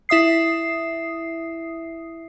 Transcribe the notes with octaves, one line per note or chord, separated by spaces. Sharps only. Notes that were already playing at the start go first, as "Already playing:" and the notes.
E4 E5 D#6 C7